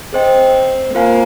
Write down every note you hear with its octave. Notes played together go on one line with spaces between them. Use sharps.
C4 G#4 C5 D#5 G5
A#3 F4 C5 F5 G#5